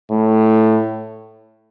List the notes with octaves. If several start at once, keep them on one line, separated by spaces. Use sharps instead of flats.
A2